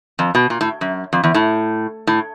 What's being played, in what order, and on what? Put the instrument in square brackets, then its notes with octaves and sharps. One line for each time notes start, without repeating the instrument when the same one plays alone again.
[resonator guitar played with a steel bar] F2
B2
A#2
A2
F#2
F2
E2
A2
A2